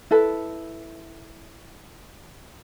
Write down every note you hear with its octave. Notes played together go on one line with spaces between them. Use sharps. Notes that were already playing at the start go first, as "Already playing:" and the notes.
E4 A4 B4